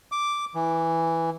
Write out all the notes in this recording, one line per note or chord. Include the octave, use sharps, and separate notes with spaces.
D6
E3